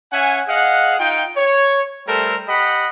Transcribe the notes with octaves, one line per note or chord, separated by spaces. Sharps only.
C#4 E5 F#5 G#5
G#4 D#5 F5 F#5
D#4 F4 G5
C#5
G3 A3 A4 A#4 C5
G4 D#5 F#5 B5